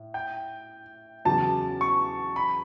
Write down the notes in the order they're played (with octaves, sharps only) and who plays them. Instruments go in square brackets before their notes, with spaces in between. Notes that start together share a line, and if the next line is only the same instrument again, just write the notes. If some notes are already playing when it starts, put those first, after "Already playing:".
Already playing: [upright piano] A2
[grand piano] G5
[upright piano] E2 C#3 F#3 [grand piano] A5
[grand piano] C#6
B5